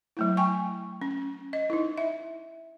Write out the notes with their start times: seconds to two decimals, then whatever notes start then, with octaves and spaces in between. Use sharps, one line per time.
0.17 F#3 A3 E4
0.37 G5 G#5 C#6
1.02 C#4
1.53 D#5
1.70 D#4 E4
1.98 E5